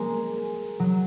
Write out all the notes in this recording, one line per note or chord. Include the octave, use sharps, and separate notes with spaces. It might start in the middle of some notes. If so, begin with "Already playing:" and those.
Already playing: G#3 A#3
F#3